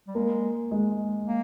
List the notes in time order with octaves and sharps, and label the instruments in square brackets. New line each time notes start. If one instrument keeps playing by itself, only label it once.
[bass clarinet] G3
[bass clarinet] G#3 [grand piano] A#3
[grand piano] G#3
[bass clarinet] A#3